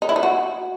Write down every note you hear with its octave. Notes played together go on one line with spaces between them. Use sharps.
D#4
E4
D#4
F#4